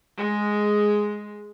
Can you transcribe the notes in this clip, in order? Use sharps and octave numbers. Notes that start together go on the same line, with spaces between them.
G#3